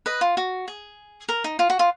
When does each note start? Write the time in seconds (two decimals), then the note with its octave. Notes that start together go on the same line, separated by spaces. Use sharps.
0.06 B4 D#5
0.21 F4
0.37 F#4
0.68 G#4
1.29 A#4
1.44 D#4
1.59 F4
1.70 F#4
1.79 F4